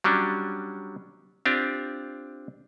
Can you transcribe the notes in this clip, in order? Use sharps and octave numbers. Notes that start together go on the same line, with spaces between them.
F#3 G3 C#4 D4
C4 D4 F4 G4